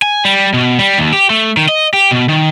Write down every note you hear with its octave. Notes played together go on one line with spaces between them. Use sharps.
G#5
G3
B2
G3
D#2
G4
A3
D#3
D#5
G4
B2
D#3